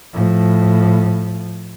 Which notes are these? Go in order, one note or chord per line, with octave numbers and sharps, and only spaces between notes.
A2 F3